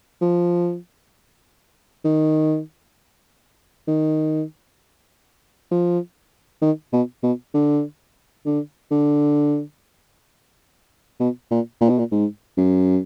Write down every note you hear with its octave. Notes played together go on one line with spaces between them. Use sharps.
F3
D#3
D#3
F3
D#3
B2
B2
D3
D3
D3
B2
A#2
A#2
B2
A#2
G#2
F#2